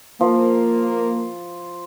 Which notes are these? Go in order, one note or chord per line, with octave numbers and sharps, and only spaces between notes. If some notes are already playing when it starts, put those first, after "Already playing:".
F3 A#3